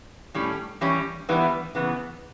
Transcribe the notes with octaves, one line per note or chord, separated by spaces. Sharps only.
A2 G3 C#4
E3 G3 C#4 G4
E3 G3 B3
C#3 E3 B3